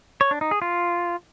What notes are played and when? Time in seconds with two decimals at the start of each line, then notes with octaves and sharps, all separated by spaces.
0.21 C#5
0.31 D4
0.41 D#4
0.51 G#4
0.62 F4